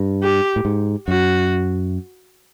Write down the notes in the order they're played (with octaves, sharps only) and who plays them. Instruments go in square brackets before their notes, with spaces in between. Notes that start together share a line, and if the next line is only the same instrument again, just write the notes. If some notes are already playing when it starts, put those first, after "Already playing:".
Already playing: [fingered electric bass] G2
[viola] G4
[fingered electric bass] A2
G#2
[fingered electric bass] F#2 [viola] F#4